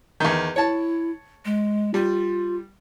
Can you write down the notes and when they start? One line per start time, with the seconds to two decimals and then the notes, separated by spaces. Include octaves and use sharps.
0.20 E2 D#3
0.56 E4 C#5 A5
1.45 G#3
1.94 G3 F4